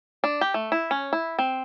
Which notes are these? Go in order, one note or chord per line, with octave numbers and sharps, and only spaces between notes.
D4
G4
A3
E4
C#4
E4
C4